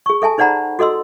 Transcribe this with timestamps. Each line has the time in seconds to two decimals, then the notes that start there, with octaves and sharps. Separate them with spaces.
0.06 G#4 C#6
0.22 A4 E5 G#5 A5
0.38 D#4 C5 D5 F#5 A#5 B5
0.79 F#4 A4 D#5 C6 E6